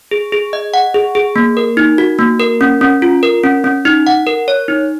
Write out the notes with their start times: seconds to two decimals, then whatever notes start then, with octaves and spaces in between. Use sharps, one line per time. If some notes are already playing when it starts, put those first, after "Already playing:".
0.11 G#4
0.32 G#4
0.53 D#5
0.74 F#5
0.94 G#4
1.15 G#4
1.36 A#3
1.57 A#4
1.77 D#4
1.98 F#4
2.19 A#3
2.40 A#4
2.61 C#4
2.81 C#4
3.02 F4
3.23 A#4
3.43 C#4
3.64 C#4
3.85 D#4
4.07 F#5
4.27 A#4
4.48 C#5
4.68 D#4